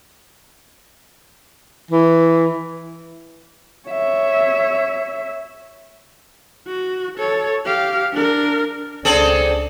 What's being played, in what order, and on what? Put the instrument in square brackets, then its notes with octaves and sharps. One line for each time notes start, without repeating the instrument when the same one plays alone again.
[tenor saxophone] E3
[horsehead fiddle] C#5 E5
F#4
A4 C#5
G4 F5
D4 A#4
[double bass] C#2 D4 [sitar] C4 G#4 A4